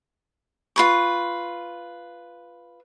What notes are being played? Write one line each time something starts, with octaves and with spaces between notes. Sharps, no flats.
F4 B4 C#6